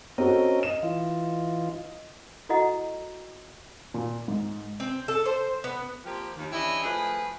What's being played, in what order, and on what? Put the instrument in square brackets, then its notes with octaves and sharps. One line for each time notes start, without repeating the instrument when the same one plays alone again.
[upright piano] C4 F#4 A4 [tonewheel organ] C#4 A#4 D#5
[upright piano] D#5 E7
[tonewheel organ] E3 F4
[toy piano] E4 F#4 A4 D#5 F#5 A#5
[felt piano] A#2
G#2
[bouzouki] C4
A4
C5
B3
[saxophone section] F3 A#3 C4 G4
D#2
E3 C#4 D4 E4 G4 D#5
F3 A3 E4 G#4 B4